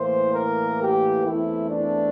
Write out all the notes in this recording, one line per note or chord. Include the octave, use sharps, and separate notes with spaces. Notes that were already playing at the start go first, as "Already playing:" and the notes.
Already playing: A2 E3 A#3 C5
A#4
G4
E2 E3 A3 C4 E4
D4